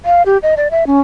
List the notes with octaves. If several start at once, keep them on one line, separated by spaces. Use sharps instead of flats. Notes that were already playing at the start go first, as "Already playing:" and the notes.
F5
G4
D#5
D5
E5
C#4